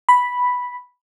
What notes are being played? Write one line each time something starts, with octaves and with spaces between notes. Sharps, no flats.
B5